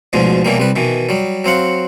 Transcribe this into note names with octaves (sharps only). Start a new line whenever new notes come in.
D2 G#2 B2 D3 F3
B2 E3 F#3 G3 A#3
C2 G3 B4
B2 D#3 E3
F#3 G3
F#3 C4 F5 F#5